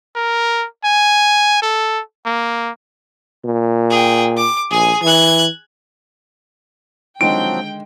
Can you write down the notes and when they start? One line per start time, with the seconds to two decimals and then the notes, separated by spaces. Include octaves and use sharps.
0.15 A#4
0.84 G#5
1.62 A4
2.26 A#3
3.45 A#2
3.90 G#4 G5
4.37 D6
4.71 A#1 G#4 G#5
5.02 E3 F#6 G#6
7.21 D3 D#3 F3 F#3 G#3 C4 G5 D7